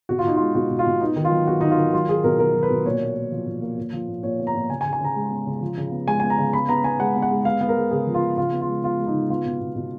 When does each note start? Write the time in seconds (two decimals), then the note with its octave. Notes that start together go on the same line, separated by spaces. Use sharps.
0.09 B2 F#4
0.19 F4
0.24 B2 D#4
0.36 G#3 F4
0.55 B2 F#4
0.70 B2
0.79 F4
0.86 B2
1.01 B3 D#4
1.16 D#3
1.25 F4
1.32 F#3
1.47 B3 F#4
1.61 D#3 D#4
1.71 F4
1.78 D#3
1.93 F#3 F4
2.09 F#3 G#4
2.24 B2 A#4
2.39 B2 A#4
2.55 F#3
2.63 B4
2.70 B2
2.85 A#2 C#5
3.01 A#3
3.15 A#3
3.32 F3
3.46 A#2
3.62 A#3
3.78 A#2
3.93 F3
4.08 A#2
4.23 A#2 C#5
4.39 B3
4.47 A#5
4.55 A#2
4.69 C#3 G#5
4.81 G#5
4.85 C#3
4.93 G#5
5.01 C#3 A#5
5.16 G#3
5.31 B3
5.47 C#3
5.61 F3
5.77 C#3
5.92 B3
6.07 G#3 G#5
6.20 B3 G#5
6.30 A#5
6.38 C#3
6.53 B3 B5
6.69 B3 A#5
6.84 B3 G#5
7.00 G#3 F#5
7.16 B3
7.22 F#5
7.31 G#3
7.45 B3 F5
7.61 B3
7.69 A#4
7.77 G#3
7.91 C#3 G#4
8.07 F3
8.14 F4
8.22 F3
8.37 C#3 F4
8.52 B3
8.61 F4
8.68 G#3
8.83 B3 F4
8.99 G#3
9.07 D#4
9.14 C#3
9.30 B3 F4
9.45 B2
9.60 B2
9.76 B2